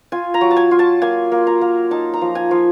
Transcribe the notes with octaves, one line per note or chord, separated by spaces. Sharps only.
F4 G#5
A#5
F#3
A5
G#5
F4
A5
A#3 G#5
A#3
A#5
A#3
D#4 A5
A#5
F3
G#5
F3